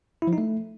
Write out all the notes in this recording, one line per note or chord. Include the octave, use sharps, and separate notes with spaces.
E4
F3
D#4
A3